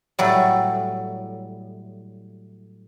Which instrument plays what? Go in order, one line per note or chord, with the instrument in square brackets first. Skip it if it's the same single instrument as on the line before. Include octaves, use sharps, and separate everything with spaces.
[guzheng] A2 F#3 G3